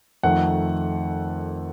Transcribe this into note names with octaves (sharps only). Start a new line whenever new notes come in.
F2 D#3 A3 F#5